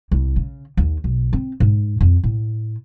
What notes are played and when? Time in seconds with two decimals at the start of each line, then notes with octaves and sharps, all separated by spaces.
0.12 C2
0.36 C#3
0.77 D#2
1.04 B1
1.33 C4
1.60 G#2
2.01 F2
2.23 A2